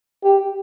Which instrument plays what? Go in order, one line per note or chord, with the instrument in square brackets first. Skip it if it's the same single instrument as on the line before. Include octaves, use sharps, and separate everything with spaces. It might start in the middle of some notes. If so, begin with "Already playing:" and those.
[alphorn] G4